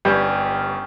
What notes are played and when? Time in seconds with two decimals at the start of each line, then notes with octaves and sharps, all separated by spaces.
0.05 G1 G3 C#4 G4 B4 G5 G#5